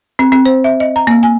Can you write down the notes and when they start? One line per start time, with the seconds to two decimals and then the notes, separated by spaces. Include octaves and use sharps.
0.19 C4
0.32 C4
0.46 C5
0.64 E5
0.80 D#5
0.96 A#5
1.07 A#3
1.23 G#5